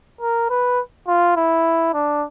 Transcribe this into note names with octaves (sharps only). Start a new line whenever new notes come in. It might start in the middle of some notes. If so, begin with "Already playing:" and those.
A#4
B4
F4
E4
D4